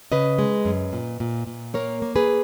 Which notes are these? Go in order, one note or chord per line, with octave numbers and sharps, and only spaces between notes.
C#3 B4 D#5
G#3
F#2
A#2
A#2
A#2
A#3 A#4 C#5
A#3
G#4 B4